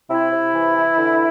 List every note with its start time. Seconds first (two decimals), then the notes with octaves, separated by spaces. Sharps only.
0.10 C3 E4
0.31 C3
0.54 E3
0.75 E3
0.97 D3